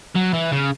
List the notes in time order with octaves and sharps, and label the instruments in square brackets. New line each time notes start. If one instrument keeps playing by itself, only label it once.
[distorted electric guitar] F#3
E3
C#3